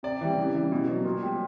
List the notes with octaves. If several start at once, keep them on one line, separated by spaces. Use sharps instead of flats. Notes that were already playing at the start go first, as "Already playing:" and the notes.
C3 D5
E3 G3
C#3
E3 G3
B2
F#3
A#2
G3